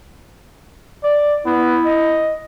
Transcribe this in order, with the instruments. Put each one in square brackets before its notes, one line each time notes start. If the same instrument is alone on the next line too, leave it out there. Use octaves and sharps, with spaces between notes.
[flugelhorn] D5
[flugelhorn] B3 [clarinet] E4
[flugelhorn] D#5